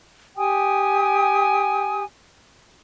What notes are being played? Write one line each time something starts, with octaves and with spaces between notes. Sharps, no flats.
G4 G5 G#5 D#6